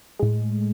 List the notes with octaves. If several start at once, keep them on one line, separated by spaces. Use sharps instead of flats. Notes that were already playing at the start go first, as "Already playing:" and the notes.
A2 G#3